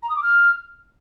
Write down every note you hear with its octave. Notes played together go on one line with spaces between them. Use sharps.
A#5
D#6
D6
F6